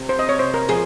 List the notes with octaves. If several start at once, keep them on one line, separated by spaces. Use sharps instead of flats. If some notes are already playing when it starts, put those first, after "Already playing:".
Already playing: C3 C4
C5
D#5
C#5
C5
A#4
F3 F4 G#4